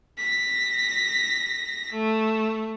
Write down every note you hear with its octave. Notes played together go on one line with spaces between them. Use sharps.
A#6 B6
A3